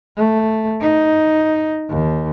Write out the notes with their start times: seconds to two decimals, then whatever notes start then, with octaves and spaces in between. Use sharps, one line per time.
0.17 A3
0.81 D#4
1.89 D#2